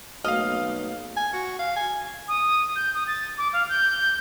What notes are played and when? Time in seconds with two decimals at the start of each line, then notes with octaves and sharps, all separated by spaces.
0.24 B1 A3 A#3 F#4 D#5 F5 F6
1.17 G#5
1.33 F#4
1.60 F5
1.76 G#5
2.28 D#6
2.76 G6
2.95 D#6
3.07 A6
3.38 D6
3.53 F5
3.69 G6